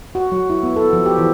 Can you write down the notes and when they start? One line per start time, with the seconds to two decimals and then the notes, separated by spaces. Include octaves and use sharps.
0.15 F#4
0.32 F#3
0.50 E4
0.63 B3
0.76 A4
0.93 F3
1.06 G4
1.18 E3